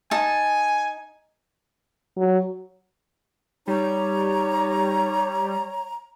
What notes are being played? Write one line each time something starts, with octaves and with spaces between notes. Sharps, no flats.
D#4 G#5 A5
F#3
G3 D#4 C#5 A#5